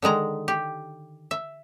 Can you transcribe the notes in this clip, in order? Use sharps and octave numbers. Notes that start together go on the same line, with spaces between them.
D3 D#3 G#3 A#5
G4
E5